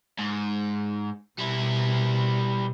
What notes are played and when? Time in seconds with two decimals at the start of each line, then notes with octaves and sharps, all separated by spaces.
0.18 G#2
1.39 B2 G3 E4